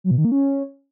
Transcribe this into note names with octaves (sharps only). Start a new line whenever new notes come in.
F#3
B2
D#3
A#3
C#4